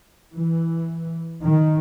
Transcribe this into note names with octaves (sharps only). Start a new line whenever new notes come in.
E3
D#3